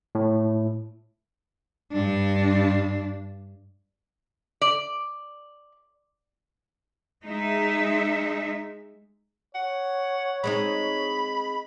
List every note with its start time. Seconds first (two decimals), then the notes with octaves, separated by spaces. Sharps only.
0.15 A2
1.92 G2 D4
4.61 D5
7.23 G#3 D#4 E5
9.55 C#5 F#5
10.44 G#3 C4 D#4 B5